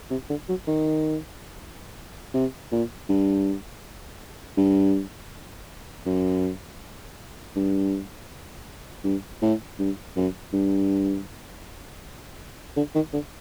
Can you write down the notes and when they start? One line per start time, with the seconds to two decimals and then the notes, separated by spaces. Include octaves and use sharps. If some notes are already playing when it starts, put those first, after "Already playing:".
0.11 C3
0.30 D3
0.49 F#3
0.67 D#3
2.34 C3
2.72 A#2
3.09 G2
4.57 G2
6.06 F#2
7.56 G2
9.04 G2
9.42 A2
9.79 G2
10.16 F#2
10.53 G2
12.76 D3
12.95 D#3
13.13 D3